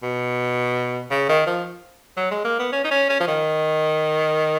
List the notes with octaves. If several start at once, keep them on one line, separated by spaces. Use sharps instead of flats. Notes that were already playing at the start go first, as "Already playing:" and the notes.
B2
C#3
D#3
F3
F#3
G#3
A#3
B3
C#4
D#4
C#4
C#4
F3
D#3